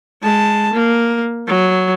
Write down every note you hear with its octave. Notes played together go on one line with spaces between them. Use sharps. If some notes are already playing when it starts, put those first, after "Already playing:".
G#3 A5
A#3
F#3